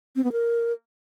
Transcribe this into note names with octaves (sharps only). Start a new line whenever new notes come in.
C4
B3
A#4